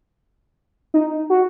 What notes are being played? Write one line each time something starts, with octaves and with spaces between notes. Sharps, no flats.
D#4
F#4